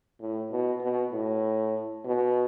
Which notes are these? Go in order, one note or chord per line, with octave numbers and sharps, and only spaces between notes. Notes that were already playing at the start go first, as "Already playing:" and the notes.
A2
B2
B2
A2
B2